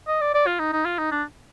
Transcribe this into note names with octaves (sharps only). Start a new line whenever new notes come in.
D#5
D5
D5
F4
D#4
D#4
F4
D#4
D4